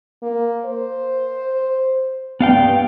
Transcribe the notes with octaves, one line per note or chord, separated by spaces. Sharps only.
A#3
C5
G2 B3 F5 G5